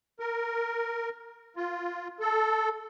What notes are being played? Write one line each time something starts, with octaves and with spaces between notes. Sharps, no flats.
A#4
F4
A4